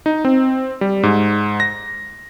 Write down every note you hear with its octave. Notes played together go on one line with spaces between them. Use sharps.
D#4
C4
G3
G#2
A#6